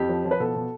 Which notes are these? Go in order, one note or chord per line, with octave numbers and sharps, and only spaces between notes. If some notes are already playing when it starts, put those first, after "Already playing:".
Already playing: F2 G4
F3
F3
B4
B2 A4
B2